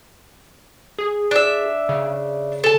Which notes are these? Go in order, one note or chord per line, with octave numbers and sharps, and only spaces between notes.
G#4
D4 E5
C#3
A4 A5